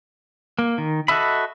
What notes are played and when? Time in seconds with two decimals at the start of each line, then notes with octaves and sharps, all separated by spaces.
0.59 A#3
0.78 D#3
1.08 F#4 A4 D#5 E5 B5